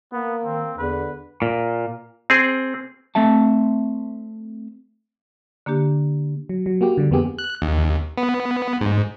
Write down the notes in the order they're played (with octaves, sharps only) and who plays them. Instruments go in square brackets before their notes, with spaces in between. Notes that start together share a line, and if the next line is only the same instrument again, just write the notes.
[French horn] A#3 [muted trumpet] B3
[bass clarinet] D#3 [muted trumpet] C4
[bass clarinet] E2 [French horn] D3 [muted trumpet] B4
[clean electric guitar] A#2
[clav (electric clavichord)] C4 G#4
[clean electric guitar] A3 C4 E5 A5
[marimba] D3 A#3 D4 G4
[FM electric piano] F#3
F#3
A#3 F#4 G4
D3 G3
F2 A#3 B3 G4 G#4
[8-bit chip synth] F#6
D#2
B3
G#2